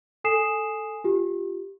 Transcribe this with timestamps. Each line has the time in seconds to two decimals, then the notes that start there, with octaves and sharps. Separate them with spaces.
0.24 A4 G#5 D#6 C7 E7
1.04 F4 G4